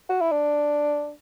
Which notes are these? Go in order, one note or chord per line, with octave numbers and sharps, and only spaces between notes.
F#4
E4
D4